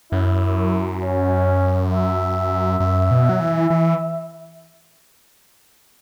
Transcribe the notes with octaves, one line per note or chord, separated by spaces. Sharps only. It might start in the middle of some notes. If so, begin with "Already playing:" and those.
F#2 E4
C#4
E5
F#2
B2
F#3
E3
E3